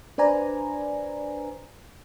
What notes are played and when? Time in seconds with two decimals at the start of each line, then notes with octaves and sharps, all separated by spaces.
0.18 D4 B4 C5 D5 G#5 A#5